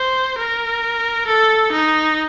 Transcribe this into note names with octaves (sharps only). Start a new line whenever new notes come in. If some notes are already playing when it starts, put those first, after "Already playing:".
Already playing: C5
A#4
A4
D#4